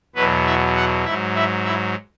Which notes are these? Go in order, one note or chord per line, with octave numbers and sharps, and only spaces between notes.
E2 B2 F#3 B3 B4
E4 E5
F#4 F#5
G#2 F#3 E4 E5
E4 E5
E4 E5